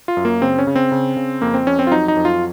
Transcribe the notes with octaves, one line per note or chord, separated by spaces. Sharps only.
F4
F#2
A#3
C#3 C4
C#4
C#3
C4
C#3
C#3
F2 A#3
C4
F2 C#4
C4
F4
F#3 D#4
D#4
F2
F4